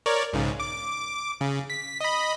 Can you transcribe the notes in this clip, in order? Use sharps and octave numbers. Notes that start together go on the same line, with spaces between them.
A#4 C#5 D5
B1 G#2 C#3
D6
C#3
B6
D#5 B5